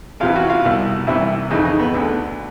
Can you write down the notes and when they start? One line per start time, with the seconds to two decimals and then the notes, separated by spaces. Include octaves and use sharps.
0.20 E2 C3 E3 F4
0.35 F#4
0.50 F4
0.64 C2 B2
1.07 C2 C3 E3 E4
1.50 F2 C#3 E3 D#4
1.65 D#4
1.79 B3
1.94 D2 D3